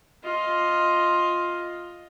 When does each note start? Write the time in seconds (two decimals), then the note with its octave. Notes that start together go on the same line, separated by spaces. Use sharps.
0.24 F4 D#5